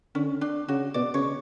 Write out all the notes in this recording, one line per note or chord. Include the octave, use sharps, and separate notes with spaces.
D3 C#4
D4
C#3 F#4
B2 D5
C#3 C#5